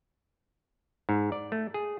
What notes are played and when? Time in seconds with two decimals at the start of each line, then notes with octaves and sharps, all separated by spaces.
1.09 G#2
1.32 D5
1.52 A3
1.74 G#4